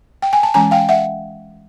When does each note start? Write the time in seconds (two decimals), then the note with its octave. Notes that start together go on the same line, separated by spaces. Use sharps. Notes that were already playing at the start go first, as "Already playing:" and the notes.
0.22 G5
0.33 G#5
0.43 A5
0.54 E3 G#3 C#4 G#5 A#5
0.71 F5 G5
0.89 E5 F#5